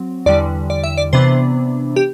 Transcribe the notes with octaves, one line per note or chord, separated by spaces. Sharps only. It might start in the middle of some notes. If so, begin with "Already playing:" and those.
Already playing: F#3 C4
E2 D3 G3 D5
D5
E5
D5
C3 E3 B3 D4 C5
G4